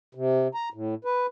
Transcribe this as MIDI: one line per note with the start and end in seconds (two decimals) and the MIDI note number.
0.15 0.48 48
0.55 0.69 82
0.74 0.94 45
1.05 1.26 71